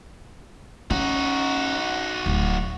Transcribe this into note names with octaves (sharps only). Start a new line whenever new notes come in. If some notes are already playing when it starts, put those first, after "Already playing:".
C#4 D#4 F#4
D1